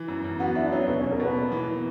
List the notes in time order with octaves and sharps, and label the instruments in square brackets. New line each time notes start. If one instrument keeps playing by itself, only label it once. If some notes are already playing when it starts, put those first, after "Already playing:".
Already playing: [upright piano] E3
F#2
F#2
[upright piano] B3 [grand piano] F#4 F#5
[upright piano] D4 [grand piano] E4 E5
[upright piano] F#3 [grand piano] C#4 C#5
[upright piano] B2 [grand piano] B3 B4
[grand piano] C#4 C#5
[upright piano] B2
[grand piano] A#4
[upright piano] B2 [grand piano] B3 B4
[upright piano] A#3
E3
E3